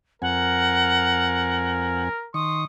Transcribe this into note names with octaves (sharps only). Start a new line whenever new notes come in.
F2 C4 A#4 F#5 G#5
D#3 C6 C#6 D#6